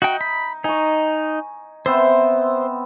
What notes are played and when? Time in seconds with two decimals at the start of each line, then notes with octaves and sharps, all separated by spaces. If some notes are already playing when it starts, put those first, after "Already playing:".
0.02 D#4 F#4 G5
0.21 B5
0.64 D#4 G#5 C#6
1.86 B3 C4 C5 E5